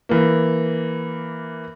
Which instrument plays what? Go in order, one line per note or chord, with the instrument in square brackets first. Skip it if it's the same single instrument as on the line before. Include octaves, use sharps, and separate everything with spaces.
[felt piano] E3 A#3